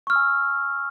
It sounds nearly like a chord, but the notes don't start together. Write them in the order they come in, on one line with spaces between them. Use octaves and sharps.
C#6 F6 E6 G#5